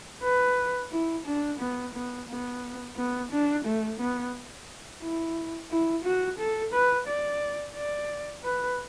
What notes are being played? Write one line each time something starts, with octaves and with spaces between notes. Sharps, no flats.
B4
E4
D4
B3
B3
B3
B3
D4
A3
B3
E4
E4
F#4
A4
B4
D5
D5
B4